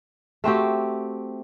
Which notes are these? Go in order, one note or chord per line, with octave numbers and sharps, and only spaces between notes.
A3 C4 F#4 G4